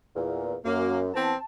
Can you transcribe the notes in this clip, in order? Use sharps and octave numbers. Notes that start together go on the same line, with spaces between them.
E2 A#2
F#2 A#3
E3 B3 C4 A5